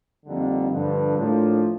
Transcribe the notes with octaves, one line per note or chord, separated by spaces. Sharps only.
F2 D3 G3 A#3 D#4
G2 D3 F3
A2 F3 A#3 D4 F4